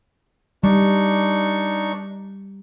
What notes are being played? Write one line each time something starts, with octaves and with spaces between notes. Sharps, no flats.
G3 D4 D#4 C#6